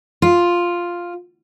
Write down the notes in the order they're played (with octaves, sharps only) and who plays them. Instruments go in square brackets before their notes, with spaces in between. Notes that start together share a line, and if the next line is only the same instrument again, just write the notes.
[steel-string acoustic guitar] F4